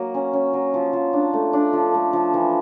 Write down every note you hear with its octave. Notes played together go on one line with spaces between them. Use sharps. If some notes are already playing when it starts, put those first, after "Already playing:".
Already playing: F#3 A#3
C#4
C#4
F#3
F3
F3
D4
A3
D4
F3
A3
F3
E3